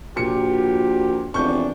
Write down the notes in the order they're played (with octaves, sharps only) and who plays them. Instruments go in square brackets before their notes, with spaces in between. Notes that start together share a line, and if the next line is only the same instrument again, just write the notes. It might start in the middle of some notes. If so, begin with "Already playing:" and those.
[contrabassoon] A#1 [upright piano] A#2 C#7 [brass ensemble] F#4 G4
[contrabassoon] F1 [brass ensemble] E2 D4 [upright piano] C#6 G6